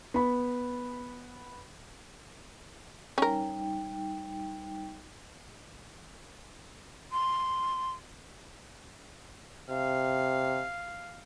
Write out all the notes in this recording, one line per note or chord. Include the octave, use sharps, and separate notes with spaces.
B3 B5
G3 C#4 D#4 A#4 G5
C6
C3 F5